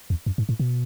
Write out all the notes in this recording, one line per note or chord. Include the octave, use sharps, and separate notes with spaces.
E2
F#2
G#2
A2
B2